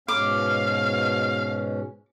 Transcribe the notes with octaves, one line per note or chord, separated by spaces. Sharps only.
G#2 B2 C#4 F5 D6